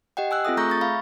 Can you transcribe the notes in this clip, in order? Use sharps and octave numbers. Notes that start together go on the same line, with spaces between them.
G4 D#5 F#5 G5
G#5 E6 F#6
C4 F4 A4 E5 D#6
A3 G#4 A#5 C#6 G6 A#6
C#6 A6
E5 F5 B5